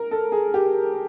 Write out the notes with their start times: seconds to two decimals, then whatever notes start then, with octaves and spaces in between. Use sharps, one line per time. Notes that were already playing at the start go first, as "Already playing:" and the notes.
Already playing: A#4
0.11 A4
0.32 G#4
0.54 G4